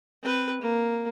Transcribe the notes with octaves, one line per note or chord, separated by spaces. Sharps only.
C4 B4
A#3